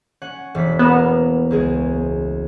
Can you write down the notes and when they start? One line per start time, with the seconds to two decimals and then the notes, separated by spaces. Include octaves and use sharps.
0.22 C#4 F#5
0.55 E1 B6
0.79 A#3 B3 A#4 E7
1.51 C#2 G#3 G#4